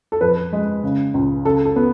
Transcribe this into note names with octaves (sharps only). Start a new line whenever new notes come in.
A4
F2 B4
G#3
C#3
C#2
C#3 A4
A4
B3